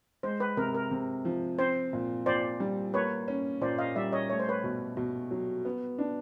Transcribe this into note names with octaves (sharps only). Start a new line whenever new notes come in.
G#3 C5
B4
C3 A#4
A#4
C3
F3
C4 C5
A#2
A#2 C5 D5
G3
A#3 B4 C#5
C#4
A#2 C5 D5
D#5 F5
G3 D5 E5
C#5 D#5
A3 C#5
C5
B4 C#5
B2
B2
F#3
B3
D4